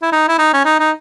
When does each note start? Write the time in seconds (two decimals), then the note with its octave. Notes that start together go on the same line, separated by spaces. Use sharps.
0.02 E4
0.12 D#4
0.28 E4
0.39 D#4
0.53 C#4
0.65 D#4
0.80 D#4